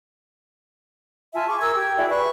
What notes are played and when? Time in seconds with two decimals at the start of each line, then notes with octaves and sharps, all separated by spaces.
1.34 F4 E5 G#5 A5
1.47 G#4 C#6 D6
1.60 A#4 E6 G#6
1.75 G4 G5 G#6
1.97 E4 F#4 G#4 D5
2.10 B4 C#6 F#6